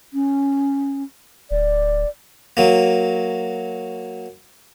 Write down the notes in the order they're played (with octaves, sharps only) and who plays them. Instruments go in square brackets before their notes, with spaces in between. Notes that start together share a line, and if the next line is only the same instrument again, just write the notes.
[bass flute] C#4
[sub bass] D1 [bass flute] D5
[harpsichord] F#3 A#3